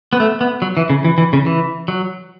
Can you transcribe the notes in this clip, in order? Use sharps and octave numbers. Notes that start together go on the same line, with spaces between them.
B3
A3
B3
F#3
E3
C#3
E3
E3
C#3
E3
F#3